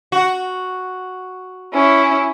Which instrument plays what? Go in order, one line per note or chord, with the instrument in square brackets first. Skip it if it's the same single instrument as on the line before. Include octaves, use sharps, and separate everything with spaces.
[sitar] F#4
[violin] C#4 E4